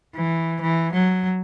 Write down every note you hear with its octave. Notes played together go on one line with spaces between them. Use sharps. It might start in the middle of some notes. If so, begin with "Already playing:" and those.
E3
E3
F#3